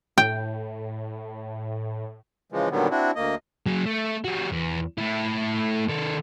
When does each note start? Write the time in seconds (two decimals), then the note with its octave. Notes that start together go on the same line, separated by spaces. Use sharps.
0.18 A2 G5
2.52 C#3 E3 F3 G#3
2.71 A#2 D3 D#3 F#3 G3 B3
2.91 C4 D4 E4 F#4
3.16 D2 A#3 D#5
3.66 F#3 G#4
3.86 A3
4.25 G3 F#4
4.52 E2
4.98 A3 E4
5.89 D#3 A4